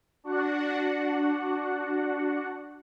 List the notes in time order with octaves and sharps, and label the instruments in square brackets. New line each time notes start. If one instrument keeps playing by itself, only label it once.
[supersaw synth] D4 F#4 F#5